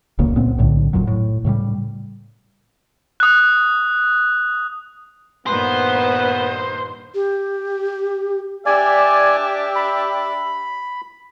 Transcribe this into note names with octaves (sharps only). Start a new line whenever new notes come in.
D#1 C#2 C#3 A#3
C#2 A#2 B3 C4
B1 A2 D3
F#1 F2 A#2 F#3
A2
A2 C#3 F3 G3
D#6 F#6
G2 A#2 D#3 B3 B4 C5
G4
D4 G4 D5 E5 G#5
B5